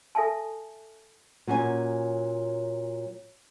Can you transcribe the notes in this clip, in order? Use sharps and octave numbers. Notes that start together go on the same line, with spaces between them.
A4 E5 G#5 A5
A#2 F#3 C#4 C#5 G#5